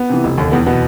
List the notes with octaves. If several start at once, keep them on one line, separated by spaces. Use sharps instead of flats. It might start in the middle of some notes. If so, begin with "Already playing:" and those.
Already playing: B3
C3 E3
F1
D#2 D3
E2 B3
B2 B3